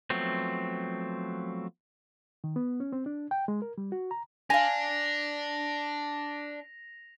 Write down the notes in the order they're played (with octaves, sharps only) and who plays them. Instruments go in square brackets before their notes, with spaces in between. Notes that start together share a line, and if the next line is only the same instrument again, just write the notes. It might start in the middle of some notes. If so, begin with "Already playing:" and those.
[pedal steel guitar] F3 F#3 A3 B3 C4
[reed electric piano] D#3
B3
C#4
C4
D4
G5
G#3
A#4
G3
F#4
A#5
[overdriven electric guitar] D4 [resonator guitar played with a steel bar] F5 G#5 [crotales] A#6 F7